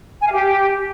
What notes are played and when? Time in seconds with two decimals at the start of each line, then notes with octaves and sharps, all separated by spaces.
0.21 G#5
0.27 F5
0.32 G4